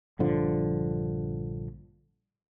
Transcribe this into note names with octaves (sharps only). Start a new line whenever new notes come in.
A#1 G2 D3 F3